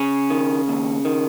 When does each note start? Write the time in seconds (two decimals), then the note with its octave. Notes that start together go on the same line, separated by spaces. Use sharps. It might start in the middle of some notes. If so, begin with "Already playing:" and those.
Already playing: C#3 C#4
0.30 D#3
0.68 D#2
1.05 D#3